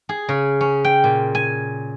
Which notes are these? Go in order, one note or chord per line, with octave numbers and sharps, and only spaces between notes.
G#4
C#3
C#4
G5
A#2
G#5